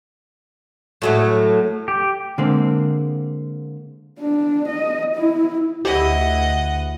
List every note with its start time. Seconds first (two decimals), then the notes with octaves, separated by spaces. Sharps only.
1.02 A2 F#3 A3
1.88 G4
2.38 D3 G#3 A#3 C4
4.20 D4
4.68 D#5
5.15 E4
5.85 D2 E4 G4 D#5 F#5